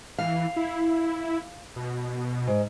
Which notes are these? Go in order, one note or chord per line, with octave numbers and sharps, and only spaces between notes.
E3 F5
E4
B2
G#2